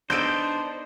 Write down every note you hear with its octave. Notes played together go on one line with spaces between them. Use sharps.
B3 D4 D#4 A4 C5 G6 D7